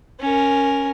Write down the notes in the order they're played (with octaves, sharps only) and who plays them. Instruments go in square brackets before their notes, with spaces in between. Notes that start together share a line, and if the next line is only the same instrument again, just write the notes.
[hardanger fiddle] C#4 A#4